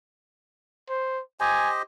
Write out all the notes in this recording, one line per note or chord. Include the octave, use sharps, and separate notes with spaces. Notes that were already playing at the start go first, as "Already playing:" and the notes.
C5
G4 C5 D#5 G#5